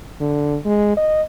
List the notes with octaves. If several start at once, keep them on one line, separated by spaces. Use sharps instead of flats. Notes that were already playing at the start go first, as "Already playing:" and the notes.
D3
G#3
D#5